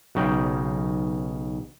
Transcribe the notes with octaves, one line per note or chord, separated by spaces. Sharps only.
B1 C#3 D#4 G5